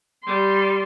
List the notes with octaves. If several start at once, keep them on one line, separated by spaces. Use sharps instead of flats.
G3 C6